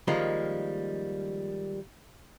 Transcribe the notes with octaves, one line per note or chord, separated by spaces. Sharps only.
D#3 F3 G3 G#3 A#3